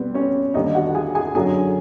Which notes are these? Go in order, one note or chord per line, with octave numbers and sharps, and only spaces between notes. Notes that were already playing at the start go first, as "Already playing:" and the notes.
Already playing: B2 G3 B3 C4
C#4 C#5
D#2 D3 G3 D#4 D#5
F#4 F#5
G#4 G#5
G#4 G#5
F#2 D3 F#3 G#4 G#5